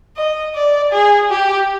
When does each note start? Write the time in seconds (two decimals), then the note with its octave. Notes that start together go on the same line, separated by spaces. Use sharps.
0.16 D#5
0.55 D5
0.92 G#4
1.30 G4